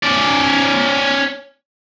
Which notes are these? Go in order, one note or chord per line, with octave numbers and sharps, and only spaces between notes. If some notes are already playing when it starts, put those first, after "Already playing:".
C#4 D5